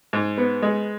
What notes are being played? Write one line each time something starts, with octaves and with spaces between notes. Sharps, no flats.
G#2
B3
G#3